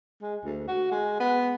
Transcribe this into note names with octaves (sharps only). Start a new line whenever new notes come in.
G#3
D2
F#4
G#3
B3